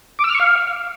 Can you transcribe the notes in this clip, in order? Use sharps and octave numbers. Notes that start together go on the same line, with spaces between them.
D6
E6
F6
C#6
F5